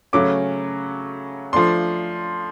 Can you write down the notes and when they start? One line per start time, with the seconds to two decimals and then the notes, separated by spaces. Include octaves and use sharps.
0.13 C#3 F#3 A3 C#4 D6
1.53 F3 A3 D4 C6